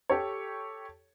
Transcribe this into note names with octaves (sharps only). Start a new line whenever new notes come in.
G4 A4 C#5